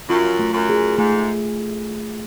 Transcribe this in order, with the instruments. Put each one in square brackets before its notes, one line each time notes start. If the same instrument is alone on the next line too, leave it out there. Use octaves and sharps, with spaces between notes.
[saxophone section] F#2 [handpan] F4
[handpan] A3
[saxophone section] F#2
[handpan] G#4
[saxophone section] G#2 [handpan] A3